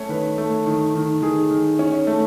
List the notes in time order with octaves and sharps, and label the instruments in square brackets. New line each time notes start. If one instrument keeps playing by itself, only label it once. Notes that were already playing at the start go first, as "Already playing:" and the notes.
Already playing: [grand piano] A3 C#4 C#5
D#3 B4
A3
D#3
D#3
D#3 G#4
D#3
C#4
A3